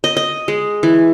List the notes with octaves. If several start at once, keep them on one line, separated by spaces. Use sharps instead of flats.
D#5
D#5
G#3
E3